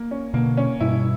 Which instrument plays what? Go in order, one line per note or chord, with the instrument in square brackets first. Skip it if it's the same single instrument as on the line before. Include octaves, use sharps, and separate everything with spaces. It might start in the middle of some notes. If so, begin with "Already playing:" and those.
Already playing: [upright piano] A#3
C#4
[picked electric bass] B2 D3 [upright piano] A#3
[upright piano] C#4
[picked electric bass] G2 B2 [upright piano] E4